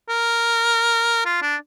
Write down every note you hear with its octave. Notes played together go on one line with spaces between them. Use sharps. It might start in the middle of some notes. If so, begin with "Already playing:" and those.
A#4
F4
D4